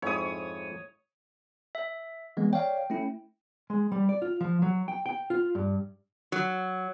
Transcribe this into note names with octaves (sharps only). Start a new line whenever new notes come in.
F2 G#2 E4 C#5 D#6
E5
E3 G#3 B3
C#5 D5 F5 G5
A3 C#4 E4
G#3
G3
D5
F4
F3
F#3
G5
G5
F4
G2
F#3